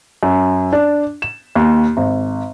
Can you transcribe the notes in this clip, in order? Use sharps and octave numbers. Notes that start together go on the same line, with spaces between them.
F#2
D4
E7
D#2
G#1